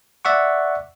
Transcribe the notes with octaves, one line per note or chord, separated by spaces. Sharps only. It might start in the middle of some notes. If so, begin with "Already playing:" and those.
D5 E5 F#5 C#6